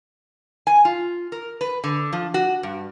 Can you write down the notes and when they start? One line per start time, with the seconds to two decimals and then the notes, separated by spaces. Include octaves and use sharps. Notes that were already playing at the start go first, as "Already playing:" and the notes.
0.67 G#5
0.85 F4
1.32 A#4
1.61 B4
1.84 D3
2.13 F3
2.34 F#4
2.63 G2